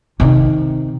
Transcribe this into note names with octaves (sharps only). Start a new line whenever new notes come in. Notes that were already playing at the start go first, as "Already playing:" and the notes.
C3 D#3